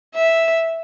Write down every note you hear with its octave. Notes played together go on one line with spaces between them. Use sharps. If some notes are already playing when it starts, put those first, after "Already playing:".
E5